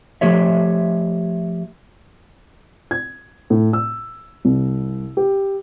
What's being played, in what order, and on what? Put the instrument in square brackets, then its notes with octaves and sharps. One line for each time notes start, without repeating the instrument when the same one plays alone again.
[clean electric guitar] F3 A3 G4 C#5 E5
[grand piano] G#6
A2
E6
C2
G4